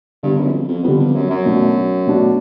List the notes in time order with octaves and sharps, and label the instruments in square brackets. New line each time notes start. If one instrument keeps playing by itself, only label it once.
[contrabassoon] G2 [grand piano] D3 G3 B3
[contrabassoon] F#2
E2
F2
F2
[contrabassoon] F2 [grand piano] D3 G3 B3
[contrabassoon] F2
F#2
F#2
[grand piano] B2 F#3 A3 D4 F#4
B2 F#3 A3 D4 F#4